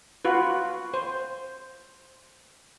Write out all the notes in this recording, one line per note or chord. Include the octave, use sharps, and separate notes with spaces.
F4 F#4 B4
C5